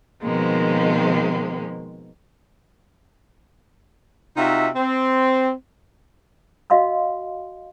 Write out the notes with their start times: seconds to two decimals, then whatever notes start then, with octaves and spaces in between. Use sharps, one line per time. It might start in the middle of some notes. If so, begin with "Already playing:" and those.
0.23 B2 D#3 F3 G#3 A#3 C4
4.37 C3 D#4 F4 F#4 E5
4.76 C4
6.70 F#4 D#5 F5 C6 E6